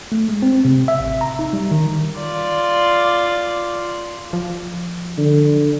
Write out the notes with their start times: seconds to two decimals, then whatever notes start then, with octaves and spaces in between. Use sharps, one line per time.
0.12 A3
0.29 G#3
0.42 C4
0.65 C3
0.88 E5
1.00 A1
1.21 A#5
1.39 D#4
1.53 G3
1.71 D#3
2.19 F4 D5
4.33 F3
5.18 D3